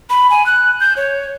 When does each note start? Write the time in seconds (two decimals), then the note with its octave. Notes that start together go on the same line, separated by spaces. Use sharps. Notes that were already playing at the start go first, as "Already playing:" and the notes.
0.10 B5
0.30 G#5
0.46 F#6
0.80 G6
0.97 C#5